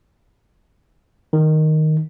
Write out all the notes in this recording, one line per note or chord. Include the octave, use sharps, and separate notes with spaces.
D#3